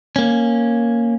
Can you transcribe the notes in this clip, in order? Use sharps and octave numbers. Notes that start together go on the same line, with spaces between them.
A#3 C#4